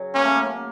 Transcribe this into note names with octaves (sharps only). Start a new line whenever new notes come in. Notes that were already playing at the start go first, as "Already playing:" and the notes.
Already playing: C#3 F#3
A#3 C#4
A3
A#3